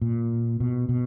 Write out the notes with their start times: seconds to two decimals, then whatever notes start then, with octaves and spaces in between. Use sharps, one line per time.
0.01 A#2
0.60 B2
0.89 B2